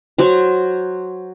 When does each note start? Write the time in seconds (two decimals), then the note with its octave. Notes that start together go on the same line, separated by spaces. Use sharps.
0.18 F#3 F#4 C5